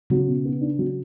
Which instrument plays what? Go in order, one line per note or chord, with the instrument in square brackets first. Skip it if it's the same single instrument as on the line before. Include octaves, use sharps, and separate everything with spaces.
[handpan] C#3 [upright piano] F#3
[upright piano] B2
B3
D4
F#3